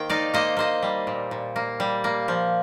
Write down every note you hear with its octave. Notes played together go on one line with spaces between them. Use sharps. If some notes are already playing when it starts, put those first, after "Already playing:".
Already playing: D#3 A#3 C5 G5
D#4 D5 F5
A#3 C5 D#5
A#3 C5 D#5
G3
A#2
A#2
A#3
G3
A#3
F3